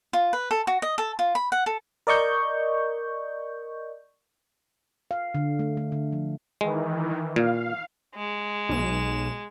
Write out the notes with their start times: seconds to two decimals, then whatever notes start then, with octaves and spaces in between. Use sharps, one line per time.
0.13 F4
0.33 B4
0.51 A4
0.67 F#4
0.82 D#5
0.98 A4
1.19 F4
1.35 B5
1.52 F#5
1.66 A4
2.07 A#4 D5 D#5 C#6 G6
5.11 F5
5.34 D3
5.59 A3
5.77 A3
5.92 D3
6.12 F3
6.61 D#3 E3 G#3
7.36 A#2 F5
8.15 G#3
8.69 B1 E7